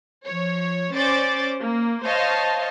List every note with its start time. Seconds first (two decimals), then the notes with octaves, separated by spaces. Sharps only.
0.24 F3 C#5
0.93 C#4 C5 D5 D6 A6
1.62 A#3
2.05 C5 C#5 D#5 F5 A5